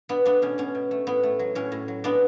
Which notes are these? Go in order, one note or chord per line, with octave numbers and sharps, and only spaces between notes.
B2 B3 D4
A3 B3 D4
B2 C#4
B2 C#4
B2
A3
A2 B3
A3
F#3
A2 C#4
A2
F#3
G#3 B3 D4